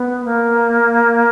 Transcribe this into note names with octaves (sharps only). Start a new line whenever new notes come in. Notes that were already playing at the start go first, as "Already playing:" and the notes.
Already playing: B3
A#3